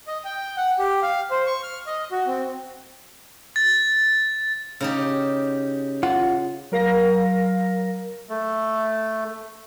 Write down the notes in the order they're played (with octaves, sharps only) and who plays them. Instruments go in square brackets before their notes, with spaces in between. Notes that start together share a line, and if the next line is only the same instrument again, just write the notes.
[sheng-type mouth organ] D#5
G5
F#5
G4
F5
C5
C#6
F6
D#5
F#4
C4
[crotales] A6
[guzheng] C#3 D#4 G4
[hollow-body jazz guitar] F4 F#5
[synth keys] F#3 A#4 F5 A#6
[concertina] A3